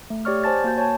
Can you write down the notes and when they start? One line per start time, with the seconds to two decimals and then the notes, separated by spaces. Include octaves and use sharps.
0.10 A3
0.25 G4 C#5 D5 C#6 F6
0.44 C5 G#5 A5 A6
0.64 A#3 F#4 G6
0.78 C#5 G#5 A5